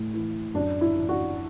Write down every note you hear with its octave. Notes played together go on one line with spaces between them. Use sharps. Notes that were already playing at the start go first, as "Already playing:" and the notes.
Already playing: A2 E3
E3
F#2 D4
E4
E3
D4 F#4